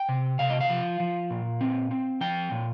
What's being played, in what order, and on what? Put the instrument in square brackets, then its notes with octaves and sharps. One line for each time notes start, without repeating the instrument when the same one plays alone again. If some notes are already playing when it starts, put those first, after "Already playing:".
Already playing: [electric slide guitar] G5
C3
C3 F5
D#5
F5
F3
F3
A#2
C4
C4
F3 G5
A#2